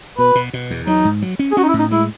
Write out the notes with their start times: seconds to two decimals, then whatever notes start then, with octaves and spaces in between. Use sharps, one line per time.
0.18 B2 B4
0.35 B2
0.53 B2
0.70 E2
0.87 F#3 D#4
1.05 G#2
1.22 F#3
1.39 C#4
1.52 G#4
1.57 C#4 F#4
1.63 D#4
1.69 E4
1.74 A2
1.79 D#4
1.91 G#3 E4